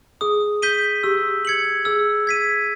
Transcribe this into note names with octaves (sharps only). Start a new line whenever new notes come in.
G#4 D#6
G6 B6 D#7 G7
G4 E6
G#6 C#7 F#7
G#4 E6
G#6 B6 D#7